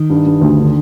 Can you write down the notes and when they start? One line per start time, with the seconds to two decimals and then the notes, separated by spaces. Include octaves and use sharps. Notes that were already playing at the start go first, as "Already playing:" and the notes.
Already playing: D#3
0.10 G2
0.26 G2
0.41 D2
0.58 D3